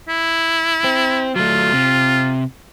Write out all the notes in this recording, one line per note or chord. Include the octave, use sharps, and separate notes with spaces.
E4
C4
F#3 A3 F4
C3